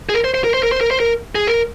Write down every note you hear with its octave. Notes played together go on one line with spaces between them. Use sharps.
G#4
A#4
C5
C5
A#4
C5
A#4
C5
A#4
C5
A#4
G#4
A#4